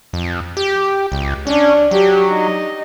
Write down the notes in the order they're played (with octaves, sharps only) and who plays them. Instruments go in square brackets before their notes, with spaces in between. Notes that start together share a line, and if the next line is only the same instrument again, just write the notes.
[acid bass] F2
G4
C#2
[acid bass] C#4 [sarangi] D4
[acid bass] F#3 [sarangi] G4
[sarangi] D#4